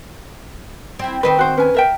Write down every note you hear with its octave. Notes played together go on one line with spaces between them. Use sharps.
C4 E4
D#3 C4 B4 D#5
F#4 C5
C#4 B4 G#5
A#4 E5 G5